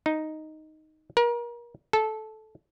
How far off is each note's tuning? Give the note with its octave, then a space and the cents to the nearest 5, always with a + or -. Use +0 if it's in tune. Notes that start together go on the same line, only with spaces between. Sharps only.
D#4 +0
A#4 +35
A4 -15